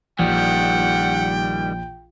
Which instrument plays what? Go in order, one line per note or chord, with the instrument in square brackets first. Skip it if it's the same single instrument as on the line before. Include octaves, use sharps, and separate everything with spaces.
[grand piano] A#1 [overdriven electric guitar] D#3 G3 [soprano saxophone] F#5 [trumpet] G5